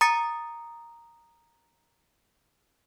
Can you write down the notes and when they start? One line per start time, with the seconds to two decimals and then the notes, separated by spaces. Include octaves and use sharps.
0.01 A#5 D#6 A6 C#7